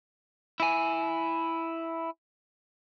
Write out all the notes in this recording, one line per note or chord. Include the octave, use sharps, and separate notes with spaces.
E4 G#5